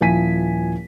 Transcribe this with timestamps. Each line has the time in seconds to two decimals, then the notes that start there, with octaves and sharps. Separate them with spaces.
0.01 D#1 F3 E4 G#5 B6 D#7